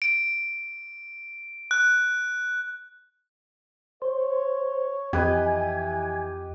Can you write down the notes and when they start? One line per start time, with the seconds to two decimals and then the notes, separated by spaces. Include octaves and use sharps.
0.02 D7
1.71 F#6
4.02 C5 C#5
5.13 F2 E3 G4 B4 D#5 G#5